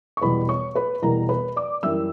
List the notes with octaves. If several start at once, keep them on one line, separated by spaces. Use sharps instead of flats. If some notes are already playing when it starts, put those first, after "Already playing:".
C#6
E2 B2 G3 B4 B5
C#5 C#6
B4 B5
E2 B2 G3 A#4 A#5
B4 B5
D5 D6
F#2 E3 G3 E5 E6